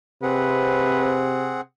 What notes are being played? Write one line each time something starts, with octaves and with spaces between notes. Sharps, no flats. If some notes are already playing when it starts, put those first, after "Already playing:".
C3 C4 G#4 B4 F#5